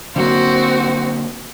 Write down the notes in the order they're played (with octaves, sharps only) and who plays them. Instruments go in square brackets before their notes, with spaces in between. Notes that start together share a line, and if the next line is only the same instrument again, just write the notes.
[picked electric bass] D3 F#3 A#3 [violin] C4 F#4